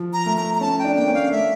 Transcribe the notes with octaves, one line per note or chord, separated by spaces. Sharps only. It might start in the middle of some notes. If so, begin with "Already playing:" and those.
Already playing: F3
A#5
A3
A#5
A#5
C#4 A5
G5
D4
A#3 G5
C#4
F5
A3 E5